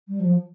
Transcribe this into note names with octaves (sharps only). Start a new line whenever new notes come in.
G3
F3